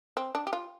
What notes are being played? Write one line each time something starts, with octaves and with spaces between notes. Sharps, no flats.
C4
D4
G4
F4